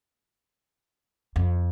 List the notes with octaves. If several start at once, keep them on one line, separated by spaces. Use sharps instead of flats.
F2